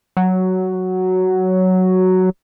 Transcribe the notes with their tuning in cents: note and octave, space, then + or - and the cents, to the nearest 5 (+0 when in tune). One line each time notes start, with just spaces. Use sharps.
F#3 +5